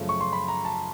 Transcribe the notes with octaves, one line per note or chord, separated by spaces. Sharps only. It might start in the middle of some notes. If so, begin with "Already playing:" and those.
Already playing: F#2 C#3 F3 A3
C#6
C6
B5
A#5
A5